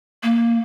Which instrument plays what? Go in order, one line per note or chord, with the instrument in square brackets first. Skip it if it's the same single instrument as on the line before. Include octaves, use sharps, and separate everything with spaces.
[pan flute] A#3